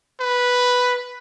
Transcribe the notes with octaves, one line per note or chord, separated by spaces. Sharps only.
B4